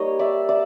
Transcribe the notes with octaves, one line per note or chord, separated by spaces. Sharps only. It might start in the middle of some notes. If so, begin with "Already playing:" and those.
Already playing: G3 A#3 D#4 C#5 D#5
D5 E5
D5 E5